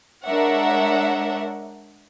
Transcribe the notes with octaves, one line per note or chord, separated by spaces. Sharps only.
G#3 D4 A#4 C#5 E5 F#5